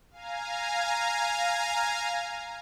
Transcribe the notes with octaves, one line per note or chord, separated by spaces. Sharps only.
F5 G#5 A#5